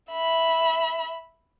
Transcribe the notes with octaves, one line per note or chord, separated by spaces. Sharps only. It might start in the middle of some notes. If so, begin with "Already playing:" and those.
E5 B5